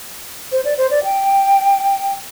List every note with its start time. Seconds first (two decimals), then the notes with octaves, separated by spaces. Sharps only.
0.52 C5
0.65 D5
0.77 C5
0.91 D5
1.04 G5